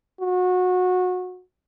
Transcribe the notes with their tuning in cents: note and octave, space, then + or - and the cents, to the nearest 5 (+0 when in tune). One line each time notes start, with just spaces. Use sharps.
F#4 -25